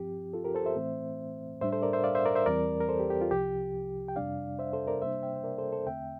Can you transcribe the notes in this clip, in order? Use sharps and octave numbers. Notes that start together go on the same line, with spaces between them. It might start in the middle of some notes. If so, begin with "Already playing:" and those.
Already playing: G2 F3 C4 G4
F4 A4
G4 A#4
A4 C5
C5 E5
A2 E3 A3 C4
A2 G3 D4 C5 E5
A4 C5
A#4 D5
C5 E5
D5 F5
C5 E5
A#4 D5
C5 E5
E2 E3 G3 C4 A#4 D5
A#4
A4 C5
G4
G4
F4
C2 C3 F3 G4
G5
F2 C3 G3 D4 D5 F5
C5 E5
A4 C5
A#4 D5
C3 G3 A#3 D4 C5 E5
E5 G5
C5
A#4 D5
A4 C5
A4 C5
E2 D3 A3 C4 E5 G5